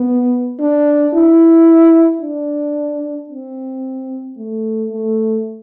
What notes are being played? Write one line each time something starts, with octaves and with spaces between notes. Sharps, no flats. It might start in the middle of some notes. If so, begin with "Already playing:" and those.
Already playing: B3
D4
E4
D4
C4
A3
A3